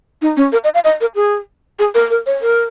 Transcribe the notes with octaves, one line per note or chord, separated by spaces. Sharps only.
D#4
C#4
A#4
D#5
F5
D#5
A#4
G#4
G#4
A#4
A#4
C#5
A#4